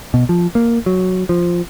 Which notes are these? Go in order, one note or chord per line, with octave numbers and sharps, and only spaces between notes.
B2
F3
A#3
F#3
F3